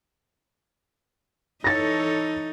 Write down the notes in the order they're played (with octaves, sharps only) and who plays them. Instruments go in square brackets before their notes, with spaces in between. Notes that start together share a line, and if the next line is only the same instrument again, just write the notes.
[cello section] E3 A4 C#5 [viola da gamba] D#4 [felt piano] A6 A#6